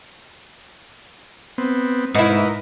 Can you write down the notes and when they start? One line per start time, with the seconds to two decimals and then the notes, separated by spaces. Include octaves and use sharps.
1.58 B3 C4
2.15 G#2 E4 A#4 B4 D#5